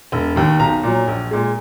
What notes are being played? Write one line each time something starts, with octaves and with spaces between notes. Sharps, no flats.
E1
D#2 D#3
B1 A#5
A#2 F#3
A#1
A#2 G#3